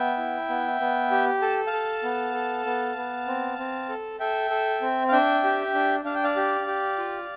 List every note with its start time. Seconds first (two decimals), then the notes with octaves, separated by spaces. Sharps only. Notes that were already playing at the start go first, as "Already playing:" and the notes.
Already playing: B3 E5 G5
0.18 E4
0.49 B3
0.80 B3
1.11 G4
1.42 A4 A5
1.67 F5 A5
1.73 A4
2.03 B3
2.34 A4
2.66 B3
2.96 B3
3.27 C4
3.58 C4
3.89 A4
4.20 A4 E5 G5
4.50 A4
4.82 C4
5.08 F5
5.12 D4 E5 G5
5.44 G4
5.74 D4
6.05 D4 F5
6.15 G5
6.24 D5 F5
6.36 G4
6.67 G4
6.98 F4